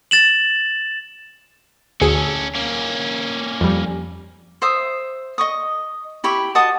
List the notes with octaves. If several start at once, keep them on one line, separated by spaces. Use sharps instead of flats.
A6 E7 F#7
D2 C#4 G#4 A4 D7
A#3 C#4
F2 G3
C5 E5 D#6
D#5 C#6 D#6
E4 G4 B5 C#6
F#4 D#5 A5 D#6